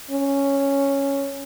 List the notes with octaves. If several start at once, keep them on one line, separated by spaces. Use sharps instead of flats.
C#4